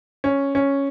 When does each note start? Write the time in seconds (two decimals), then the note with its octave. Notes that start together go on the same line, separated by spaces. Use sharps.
0.24 C#4
0.55 C#4